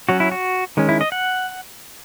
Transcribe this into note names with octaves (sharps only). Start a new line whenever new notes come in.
F#3 C#4 F#4
E4
F#4
D#3 G#3 C#4
E4
D#5
F#5